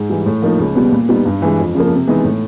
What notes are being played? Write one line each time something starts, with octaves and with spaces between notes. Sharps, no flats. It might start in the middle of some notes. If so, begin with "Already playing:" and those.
Already playing: G#2
E3 G3
A2
F3 A#3 D#4
C#2
B2 G3 B3
A#2
G3 B3 D#4
G2
E3 G#3
F2
C#3 F3 A#3
C3
E3 G#3 B3 D#4
A2